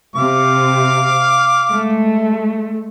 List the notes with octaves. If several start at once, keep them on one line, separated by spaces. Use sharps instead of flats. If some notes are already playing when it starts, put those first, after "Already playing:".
C3 F5 D6
G#3 A3